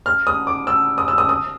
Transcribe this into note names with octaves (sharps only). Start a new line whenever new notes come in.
F6
D#6
D6
E6
D#6
E6
D#6
D#6